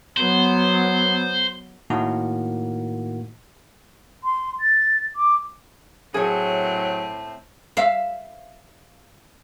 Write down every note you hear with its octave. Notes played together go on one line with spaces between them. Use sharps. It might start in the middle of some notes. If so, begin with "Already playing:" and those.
F#3 B3 C5
A2 D#3 A#3 F#4
C6
A6
D6
A2 F#3 C4 G#4 C#5 E5 A5
E5 F5